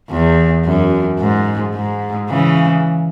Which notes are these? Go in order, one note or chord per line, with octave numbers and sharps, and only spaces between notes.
E2
F#2
G#2
G#2
C#3 E3